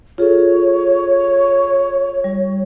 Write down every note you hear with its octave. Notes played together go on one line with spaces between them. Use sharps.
F4 G#4 A4 C#5
G3